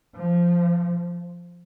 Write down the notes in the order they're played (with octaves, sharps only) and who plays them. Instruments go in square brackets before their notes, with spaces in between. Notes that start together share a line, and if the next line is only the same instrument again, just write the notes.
[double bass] F3